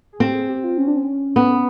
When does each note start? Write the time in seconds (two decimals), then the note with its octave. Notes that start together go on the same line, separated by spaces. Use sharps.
0.13 G#4
0.20 C4 G4
0.34 G#4
0.49 G4
0.64 F4
0.78 C#4
0.88 D4
0.97 C#4
1.36 B3